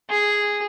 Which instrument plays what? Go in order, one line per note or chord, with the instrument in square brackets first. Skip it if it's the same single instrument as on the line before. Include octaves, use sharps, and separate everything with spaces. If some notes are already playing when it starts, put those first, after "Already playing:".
[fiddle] G#4